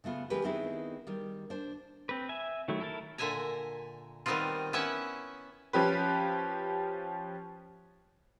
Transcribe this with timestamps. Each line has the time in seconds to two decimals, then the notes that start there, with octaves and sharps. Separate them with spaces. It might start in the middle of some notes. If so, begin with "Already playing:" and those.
0.04 C#3 A3 B3 F4
0.30 E3 G#3 C#4 G4 G#4 B4
0.43 D#3 B3 C4 D#4 E4 G#4
1.07 D#3 G3
1.50 D4 C5
2.09 C4 B4
2.29 E5 G#5
2.68 D#3 F#3 A3 E4
2.80 E4 A4 A#4 A5
3.18 A#2 D3 E5 G#5 A#5
4.26 D#3 G3 B3 C4 D#4 F4
4.73 B3 C#4 E4 E5 F#5
5.73 F3 C#4 G4 B4